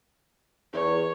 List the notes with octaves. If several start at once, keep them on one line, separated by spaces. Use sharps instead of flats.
E2 C#5